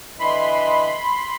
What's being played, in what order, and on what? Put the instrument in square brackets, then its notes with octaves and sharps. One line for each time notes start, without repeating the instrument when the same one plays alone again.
[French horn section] D3 E3 D#5 [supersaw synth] B5 C6